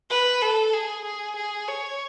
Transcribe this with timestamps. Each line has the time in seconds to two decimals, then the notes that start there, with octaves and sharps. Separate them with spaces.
0.10 B4
0.41 A4
0.73 G#4
1.04 G#4
1.36 G#4
1.68 C#5